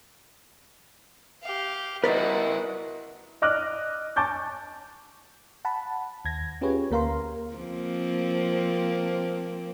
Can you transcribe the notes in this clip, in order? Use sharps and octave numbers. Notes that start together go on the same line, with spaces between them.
G4 F5
B3 E4 F#4 A#4 B4 D5 D#5
D5 D#5 D6 F6 F#6
G#5 A5 C#6 D6 G6 A6
F#5 A5 B5
D#2 G#6 A#6
C#4 F4 G4 G#4 B4 C#5
D2 A#3 A#4 F5 A#5 C6
F3 A#3 C4